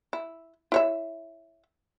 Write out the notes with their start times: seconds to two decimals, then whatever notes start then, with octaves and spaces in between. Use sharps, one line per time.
0.13 E4
0.72 E4 C#5 E5